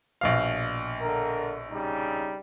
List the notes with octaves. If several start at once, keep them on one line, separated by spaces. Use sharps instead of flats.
A#1 B2 F5
D3 A#4
C#3 G3 D#4